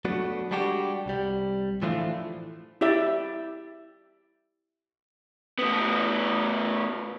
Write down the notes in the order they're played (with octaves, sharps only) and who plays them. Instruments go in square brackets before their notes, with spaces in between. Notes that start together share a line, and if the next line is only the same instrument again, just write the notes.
[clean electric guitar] F#3 A3 B3 D4 F#4 A4
G3 G#3 D4 F#4 G4
C2 G3
A2 D3 E3 F3 A3 F4
[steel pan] E4 G4 D5 E5
[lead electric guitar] A2 B3